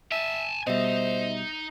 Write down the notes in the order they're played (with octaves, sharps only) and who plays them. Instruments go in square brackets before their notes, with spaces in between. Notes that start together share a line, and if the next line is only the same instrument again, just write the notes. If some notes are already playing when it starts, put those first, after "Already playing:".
[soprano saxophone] E5 [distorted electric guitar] G#5 A5
[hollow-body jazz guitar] B2 G3 [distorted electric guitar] D#4 [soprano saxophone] C5 [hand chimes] D#5 E5